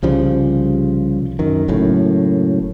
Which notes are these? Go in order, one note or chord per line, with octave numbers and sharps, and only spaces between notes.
C2 C#3 F3 G3
F#2 D#3
F#1 F#2 A2